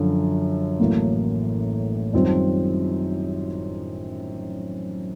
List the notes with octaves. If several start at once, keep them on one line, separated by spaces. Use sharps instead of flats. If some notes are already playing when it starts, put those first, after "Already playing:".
Already playing: F#2 D3 F3
A1 A2 F#3 A#3
F#2 D#3 G3 C4 F4